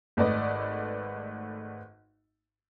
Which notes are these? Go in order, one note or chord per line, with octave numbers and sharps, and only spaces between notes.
G#1 A3 B4 D5 D#5